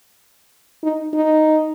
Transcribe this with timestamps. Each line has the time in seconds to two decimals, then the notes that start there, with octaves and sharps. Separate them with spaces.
0.83 D#4
1.14 D#4